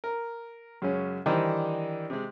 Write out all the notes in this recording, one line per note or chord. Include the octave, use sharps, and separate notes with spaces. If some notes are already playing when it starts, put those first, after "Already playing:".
A#4
F#2 C#3 G#3 C#4
D#3 E3 G3 D4 D#4 C5
C3 G#3